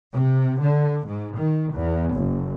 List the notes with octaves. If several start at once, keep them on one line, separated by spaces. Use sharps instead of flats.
C3
D3
G#2
D#3
E2
F#1